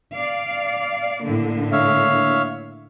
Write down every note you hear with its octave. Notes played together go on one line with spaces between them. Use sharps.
D5 F5
A2 D3 A#3
C#5 E5 F5